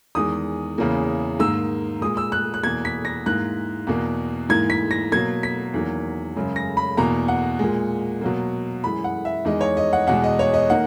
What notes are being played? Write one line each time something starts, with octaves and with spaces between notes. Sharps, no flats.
E2 D#3 G#3 D#6
E2 C#3 E3 A#3
G#2 D#3 A#3 E6
A#2 G#3 D#6
E6
F#6
F#6
E2 B2 A#3 G#6
B6
A#6
G#2 E3 A#3 F#6
E2 B2 A#3
G#2 E3 A#3 G#6
B6
A#6
B2 F#3 A#3 G#6
B6
E2 D#3 F#3 A#3
F#2 C#3 G#3
A#6
B5
E2 B2 A#3 A#5
F#5
A#2 G#3
B2 F#3 A#3
F#2 E3 G#3 B5
F#5
E5
E2 D#3 G#3 D#5
C#5
D#5
F#5
E2 B2 G#3 F#5
D#5
C#5
D#5
D#3 A#3 F#5